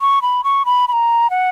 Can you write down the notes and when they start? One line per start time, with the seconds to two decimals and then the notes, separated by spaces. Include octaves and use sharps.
0.01 C#6
0.22 B5
0.44 C#6
0.65 B5
0.88 B5
0.93 A#5
1.30 F#5